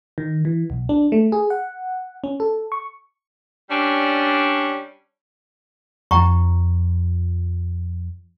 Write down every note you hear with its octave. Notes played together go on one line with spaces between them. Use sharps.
D#3
E3
B1
D4
A3
G#4
F#5
C#4
A4
C#6
G3 C#4 D4
F2 F3 G5 A#5 C#6